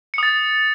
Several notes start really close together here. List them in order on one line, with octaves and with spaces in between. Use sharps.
C#7 D#6 A6